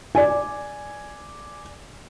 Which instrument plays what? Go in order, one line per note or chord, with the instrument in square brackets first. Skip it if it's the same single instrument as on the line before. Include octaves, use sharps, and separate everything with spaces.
[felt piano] D5 G#5